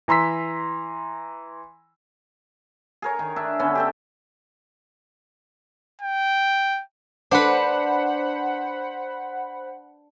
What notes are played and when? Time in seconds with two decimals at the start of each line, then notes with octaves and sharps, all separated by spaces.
0.08 E3 A#5 C6 E6 B6
3.02 G#4 A#4 C#5
3.19 D#3
3.36 D4 E5
3.59 D3 B3 C#4
3.75 G4 A4 G5
6.02 G5
7.31 D4 B4 C5 F#5 B5